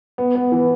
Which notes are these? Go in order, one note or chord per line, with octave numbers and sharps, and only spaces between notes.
B3
B3
E3